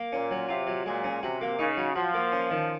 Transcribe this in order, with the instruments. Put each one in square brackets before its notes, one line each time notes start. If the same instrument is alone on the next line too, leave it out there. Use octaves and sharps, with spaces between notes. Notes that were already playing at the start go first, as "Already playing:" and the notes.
Already playing: [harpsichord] A#3
[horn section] A#2 [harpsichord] C#4
[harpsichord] F#3
[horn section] C3 [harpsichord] F4
[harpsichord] F#3
[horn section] A#2 [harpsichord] G#3
[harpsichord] C#4
[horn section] C3 [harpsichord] F#4
[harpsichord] A#3
[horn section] C#3 [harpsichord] D#4
[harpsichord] F#3
[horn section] F3 [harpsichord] F#4
[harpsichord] A#3
C#4
D#3